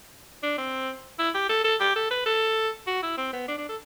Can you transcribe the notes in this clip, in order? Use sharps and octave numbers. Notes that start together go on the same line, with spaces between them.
D4
C4
E4
G4
A4
A4
G4
A4
B4
A4
F#4
E4
C4
B3
D4
D4
A4